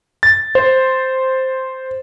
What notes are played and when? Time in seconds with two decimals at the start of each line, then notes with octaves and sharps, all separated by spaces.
0.23 A6
0.55 C5